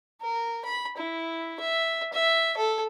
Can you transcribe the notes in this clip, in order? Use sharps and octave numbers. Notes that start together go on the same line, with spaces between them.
A#4
B5
E4
E5
E5
A4